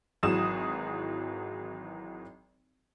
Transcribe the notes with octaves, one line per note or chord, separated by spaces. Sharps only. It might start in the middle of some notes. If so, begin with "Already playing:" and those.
G#1 E3 F#3 G#4 D#6 E7